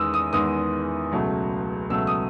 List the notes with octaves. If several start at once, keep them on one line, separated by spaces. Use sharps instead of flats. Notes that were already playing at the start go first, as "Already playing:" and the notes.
Already playing: E2 D#3 G#3 B3 D#6 E6
D#6
E2 D#3 G#3 B3 D#6
C#2 B2 F#3 A3
C#2 B2 F#3 A3 E6
D#6